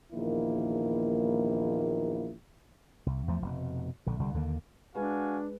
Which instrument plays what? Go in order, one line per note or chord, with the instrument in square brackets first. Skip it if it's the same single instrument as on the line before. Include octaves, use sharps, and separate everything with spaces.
[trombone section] A#1 E2 D#3 A#3 E4
[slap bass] C2
E2 F3 A3
F1 B2
A#1 D3
C2 D3 G3
D#2 D3 D#3 A#3
[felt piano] G#3 B4 [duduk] D4 [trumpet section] F#4 F5 G#5